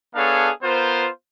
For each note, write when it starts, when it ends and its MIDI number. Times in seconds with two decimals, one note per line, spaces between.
0.16 0.50 59
0.16 0.50 62
0.16 0.50 68
0.16 0.50 69
0.16 0.50 73
0.16 0.50 77
0.63 1.09 59
0.63 1.09 65
0.63 1.09 70
0.63 1.09 72